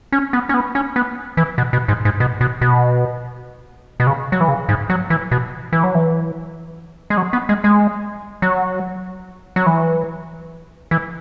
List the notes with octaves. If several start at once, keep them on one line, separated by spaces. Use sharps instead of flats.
C#4
B3
C#4
B3
C#4
B3
E3
B2
B2
G#2
G#2
B2
B2
B2
B2
C#3
F#3
E3
C#3
G#2
F#3
E3
B2
E3
F#3
E3
G#3
F#3
B3
G#3
G#3
F#3
F#3
E3
E3